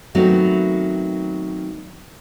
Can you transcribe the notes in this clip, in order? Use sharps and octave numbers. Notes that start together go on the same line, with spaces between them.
D#3 F#3 A3 B3 C4